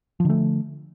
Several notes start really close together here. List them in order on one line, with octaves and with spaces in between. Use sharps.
F3 D3 A3